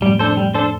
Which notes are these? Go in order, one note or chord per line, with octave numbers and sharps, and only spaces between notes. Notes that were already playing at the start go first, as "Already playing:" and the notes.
F2 A2 G3
D4 A4 C5
G3
D4 A4 C5